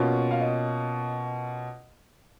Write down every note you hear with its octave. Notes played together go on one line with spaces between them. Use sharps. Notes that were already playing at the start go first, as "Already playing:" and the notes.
Already playing: B2 A#3 C#4 F4
F5
D#5